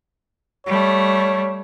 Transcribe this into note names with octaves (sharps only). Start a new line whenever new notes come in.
G3 A3 C#5